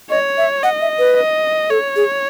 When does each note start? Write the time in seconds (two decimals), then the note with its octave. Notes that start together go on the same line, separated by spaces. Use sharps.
0.10 C#5 D#5
0.38 E5
0.63 D#5 F#5
0.81 E5
0.99 B4
1.16 D#5
1.70 A4 C#5
1.96 G#4